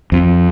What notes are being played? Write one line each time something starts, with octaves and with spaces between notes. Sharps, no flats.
F2